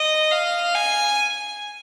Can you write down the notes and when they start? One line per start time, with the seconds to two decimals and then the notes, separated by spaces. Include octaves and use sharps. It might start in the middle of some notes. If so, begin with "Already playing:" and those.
Already playing: D#5
0.32 F5
0.75 G#5